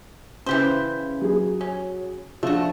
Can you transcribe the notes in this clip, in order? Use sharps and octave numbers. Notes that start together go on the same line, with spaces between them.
C#3 E3 G4 C5
F#3 F#4 G#4
C#4
F3 A3 D4 F#4